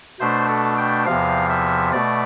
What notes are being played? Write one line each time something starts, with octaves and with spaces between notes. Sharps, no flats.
B2 A3 D4 C5
A4
G5
E2 C3 F3 F5
E5
B2 A3 D5